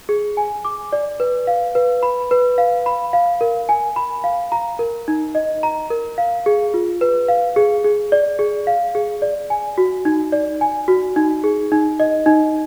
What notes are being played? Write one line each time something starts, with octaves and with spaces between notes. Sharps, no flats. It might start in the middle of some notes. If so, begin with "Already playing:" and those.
G#4
G#5
D6
D5
B4
F5
B4
B5
B4
F5
B5
F5
A#4
G#5
B5
F5
A#5
A#4
D#4
D#5
A#5
A#4
F5
G#4
F4
B4
F5
G#4
G#4
D5
G#4
F5
G#4
D5
G#5
F#4
D#4
D5
G#5
F#4
D#4
G#4
D#4
D#5
D#4